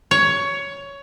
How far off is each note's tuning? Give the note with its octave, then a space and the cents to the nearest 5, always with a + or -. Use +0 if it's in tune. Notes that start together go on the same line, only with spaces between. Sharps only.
C#5 +15